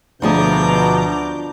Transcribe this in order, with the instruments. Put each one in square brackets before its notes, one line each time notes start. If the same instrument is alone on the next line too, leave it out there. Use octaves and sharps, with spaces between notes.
[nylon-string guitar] D2 F3 G#4 [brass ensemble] B2 [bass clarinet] D4 [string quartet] A#5 D6 G6